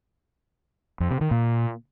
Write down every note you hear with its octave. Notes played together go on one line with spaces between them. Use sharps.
F2
C3
D#3
A#2